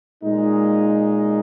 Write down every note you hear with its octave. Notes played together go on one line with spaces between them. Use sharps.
A#2 G#3 D#4